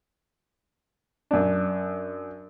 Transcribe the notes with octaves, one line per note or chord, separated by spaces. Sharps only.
F#2 D4